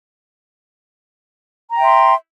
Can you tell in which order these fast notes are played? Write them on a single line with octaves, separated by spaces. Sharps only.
A#5 G5 E5 C6